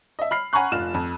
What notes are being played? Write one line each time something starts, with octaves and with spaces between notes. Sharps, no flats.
D#5 E5
B5 F6 C7
F#5 G#5 A#5 B5 C#6 F#6
F1 F4 F6 E7
F2